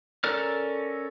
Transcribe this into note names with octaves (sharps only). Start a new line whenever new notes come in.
C#4 A4 A#4 D5 F6